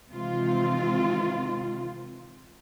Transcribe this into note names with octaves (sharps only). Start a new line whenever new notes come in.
C3 D#3 E3 G#3 C4 F4